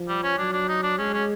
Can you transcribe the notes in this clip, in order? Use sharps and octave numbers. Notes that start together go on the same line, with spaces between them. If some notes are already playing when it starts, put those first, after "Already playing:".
Already playing: F3
G3
C#4
F#3 D4
D4
D#4
D4
G#3 C#4
C#4